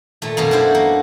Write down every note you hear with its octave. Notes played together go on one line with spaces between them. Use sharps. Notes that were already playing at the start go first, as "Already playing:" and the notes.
A#2 A3
F#2 B2 A3 A#3
D4 E4 F#4 C5
A#3